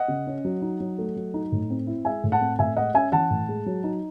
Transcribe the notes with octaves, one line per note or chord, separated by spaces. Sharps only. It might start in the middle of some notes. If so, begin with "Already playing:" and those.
Already playing: D#5 F#5
C#3
C#4
F#3
D#4
F#3
A3
F#3
D#4
A2
C4
E4
G#3 E5 G#5
A2
F#5 A5
C4
A2 E5 G#5
G#3 D#5 F#5
C#4 E5 G#5
E3 F#5 A5
A2
G#3
F#3
D#4